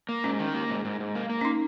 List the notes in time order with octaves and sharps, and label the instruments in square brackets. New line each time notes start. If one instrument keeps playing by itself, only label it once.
[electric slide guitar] A#3
[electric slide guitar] G#2 [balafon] C#4
[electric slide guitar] D#3
A#3
G#2
G#2
G#2
A#3
A#3
[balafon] C#4
D#4